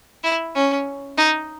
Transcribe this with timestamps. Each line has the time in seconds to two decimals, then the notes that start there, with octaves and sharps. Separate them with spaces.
0.24 E4
0.55 C#4
1.17 D#4